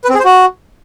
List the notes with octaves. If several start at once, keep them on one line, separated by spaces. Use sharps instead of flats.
B4
C4
G#4
C5
F#4